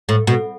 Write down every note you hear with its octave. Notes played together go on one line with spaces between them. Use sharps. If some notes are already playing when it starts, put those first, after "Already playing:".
A2
B2